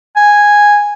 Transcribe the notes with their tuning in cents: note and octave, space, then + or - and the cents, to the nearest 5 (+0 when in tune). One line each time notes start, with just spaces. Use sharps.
G#5 -5